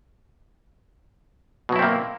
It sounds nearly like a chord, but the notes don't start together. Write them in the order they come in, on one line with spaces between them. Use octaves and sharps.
B2 F#3 E4 C4 A#3